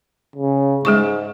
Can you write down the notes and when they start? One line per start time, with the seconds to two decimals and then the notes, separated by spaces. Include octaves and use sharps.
0.36 C#3
0.85 G#2 G#3 G#4 C#6